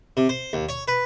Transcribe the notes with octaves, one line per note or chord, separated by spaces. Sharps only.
C3
C5
D#2
C#5
B4